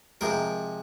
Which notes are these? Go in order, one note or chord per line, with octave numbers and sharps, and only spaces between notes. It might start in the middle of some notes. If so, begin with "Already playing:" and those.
C3 F3 G#3 A#4